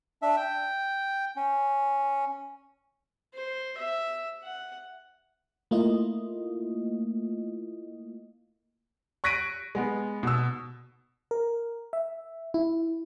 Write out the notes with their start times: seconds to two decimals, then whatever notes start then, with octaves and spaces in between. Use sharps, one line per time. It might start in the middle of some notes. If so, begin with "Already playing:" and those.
0.22 D4 E5
0.36 G5
1.36 C#4
3.34 C5
3.77 E5
4.43 F#5
5.71 A3 A#3 E4 F4 D#5
9.24 C#6 F#6 A#6 B6 D7 D#7
9.75 G#3 B3
10.23 B2 E6
11.31 A#4
11.93 E5
12.54 E4